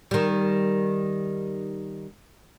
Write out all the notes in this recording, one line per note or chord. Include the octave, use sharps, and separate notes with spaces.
D#3 G3